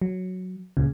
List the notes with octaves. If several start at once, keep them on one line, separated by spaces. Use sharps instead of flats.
F#3
C#2 A#2 C#3